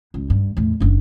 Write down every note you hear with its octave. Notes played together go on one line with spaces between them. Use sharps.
C#2
G2
E2 A2
F#1 D4